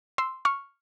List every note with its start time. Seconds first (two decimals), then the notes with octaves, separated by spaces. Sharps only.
0.18 C6 E6
0.45 C#6 F6